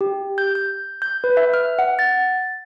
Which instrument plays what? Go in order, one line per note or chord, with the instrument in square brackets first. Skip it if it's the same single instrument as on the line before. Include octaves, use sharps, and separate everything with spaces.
[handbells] G4
G6
G6
G6
B4
E5
F6
F#5
A6